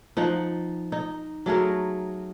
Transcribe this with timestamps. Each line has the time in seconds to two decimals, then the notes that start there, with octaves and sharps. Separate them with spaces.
0.17 F3 D#4 F#5
0.92 D#4
1.46 F#3 A3 G#4 A#4